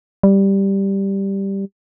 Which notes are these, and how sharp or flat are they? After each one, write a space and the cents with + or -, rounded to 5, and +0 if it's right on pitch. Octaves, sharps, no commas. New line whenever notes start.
G3 +0